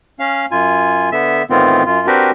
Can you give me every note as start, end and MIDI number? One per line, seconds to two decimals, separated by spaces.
0.19 0.46 61
0.19 0.46 77
0.51 1.09 42
0.51 1.09 65
0.51 1.09 80
1.12 1.43 50
1.12 1.43 59
1.12 1.43 76
1.50 1.83 45
1.50 1.83 51
1.50 1.83 52
1.50 1.83 59
1.50 1.83 60
1.50 1.83 65
1.86 2.06 42
1.86 2.06 65
2.07 2.31 60
2.07 2.31 62
2.07 2.31 66
2.07 2.31 67
2.07 2.31 70
2.07 2.31 71